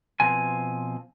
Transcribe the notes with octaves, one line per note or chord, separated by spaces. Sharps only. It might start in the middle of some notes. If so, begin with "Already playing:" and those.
B2 F3 C4 G#5